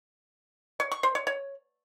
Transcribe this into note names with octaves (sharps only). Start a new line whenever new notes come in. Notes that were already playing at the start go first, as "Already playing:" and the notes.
C#5
C#6
C5
C#5
C#5